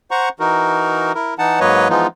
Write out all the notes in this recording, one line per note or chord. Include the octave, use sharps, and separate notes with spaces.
C5 F#5 A#5 C#6
E3 D#4 F#4 A#4
E4 A#4
E3 D#4 F#5 A5
G#2 F#3 A#3 B4 C#5 D#5
E3 F3 G#3 B3 D#4 F4